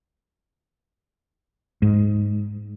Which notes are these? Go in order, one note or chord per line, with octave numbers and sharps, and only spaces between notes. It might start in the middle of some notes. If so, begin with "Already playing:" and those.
G#2